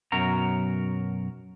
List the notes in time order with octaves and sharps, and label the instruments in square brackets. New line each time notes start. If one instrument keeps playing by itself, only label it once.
[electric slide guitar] F#2 B2 F#3 F#4 A#4 A#5